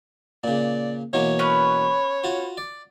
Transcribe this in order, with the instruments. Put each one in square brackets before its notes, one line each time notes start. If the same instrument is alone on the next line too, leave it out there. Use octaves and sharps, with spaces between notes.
[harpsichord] A#2 C#3 [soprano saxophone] D5
[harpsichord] B2 E3 A#3 [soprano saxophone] C#5
[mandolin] B3 C#4 B4
[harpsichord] F4 F#4
D5